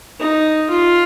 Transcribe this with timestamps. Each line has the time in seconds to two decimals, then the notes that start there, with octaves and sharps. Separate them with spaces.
0.20 D#4
0.70 F4